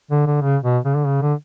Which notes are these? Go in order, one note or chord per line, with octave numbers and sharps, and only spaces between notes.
D3
D3
C#3
B2
C#3
D3
C#3
D3